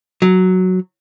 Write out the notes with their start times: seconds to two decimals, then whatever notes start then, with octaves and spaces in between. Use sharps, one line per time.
0.22 F#3